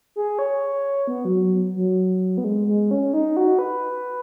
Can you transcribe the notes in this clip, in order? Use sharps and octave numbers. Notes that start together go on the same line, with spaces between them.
G#4
C#5
B3
F#3
F#3
F#3
B3
G#3
G#3
C#4
D#4
F#4
B4